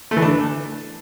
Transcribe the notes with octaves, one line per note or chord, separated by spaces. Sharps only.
A3
E3
D4